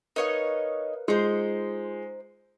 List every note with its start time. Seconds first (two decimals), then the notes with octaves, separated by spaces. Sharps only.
0.16 D#4 A#4 B4 C#5 D#5 F5
1.08 G#3 D#4 F4 C5